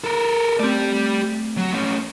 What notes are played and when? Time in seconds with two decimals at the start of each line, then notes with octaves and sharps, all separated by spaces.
0.04 A4 A#4
0.60 A3 C4 G4 D5
1.57 F#3
1.73 A3 C#4